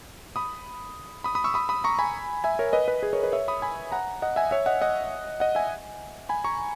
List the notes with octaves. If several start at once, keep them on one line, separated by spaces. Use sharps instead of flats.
B5 D#6
B5 D#6
B5 D#6
C#6 E6
B5 D#6
B5 D#6
A#5 C#6
G#5 B5
E5 G#5
A#4 C#5
B4 D#5
B4 D#5
G#4 B4
A#4 C#5
B4 D#5
C#5 E5
B5 D#6
G#5 B5
F#5 A#5
D#5 F#5
E5 G#5
C#5 E5
D#5 F#5
D#5 F#5
D#5 F#5
E5 G#5
G#5 B5
A#5 C#6